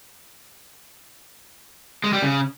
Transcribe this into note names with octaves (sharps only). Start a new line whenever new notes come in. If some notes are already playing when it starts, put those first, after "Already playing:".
G#3
G3
C#3